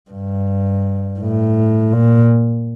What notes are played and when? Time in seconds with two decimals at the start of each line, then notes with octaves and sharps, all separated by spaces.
0.11 G2
1.20 A2
1.93 A#2